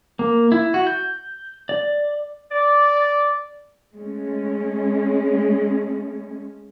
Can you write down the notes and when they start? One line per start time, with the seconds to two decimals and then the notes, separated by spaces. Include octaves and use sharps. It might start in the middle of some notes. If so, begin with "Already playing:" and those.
0.19 A#3
0.52 E4
0.74 F#4
0.87 G6
1.69 D5
2.50 D5
3.93 G#3 A3 C#4